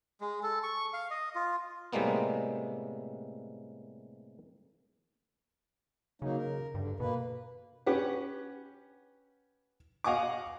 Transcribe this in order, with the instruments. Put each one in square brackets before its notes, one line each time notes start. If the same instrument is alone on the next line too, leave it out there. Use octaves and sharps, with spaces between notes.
[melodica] G#3
A4
C#6
F5
D#5
F4
[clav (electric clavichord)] A2 C3 G3 G#3 A#3 B3
[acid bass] C#3 [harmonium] F#3 A#3 D#4
[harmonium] A#4
[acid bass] G2 [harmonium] D3
[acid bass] B2 [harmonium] A#3 B4
[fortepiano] C#4 G4 B4 F#5
D#5 F5 F#5 G#5 C#6 D6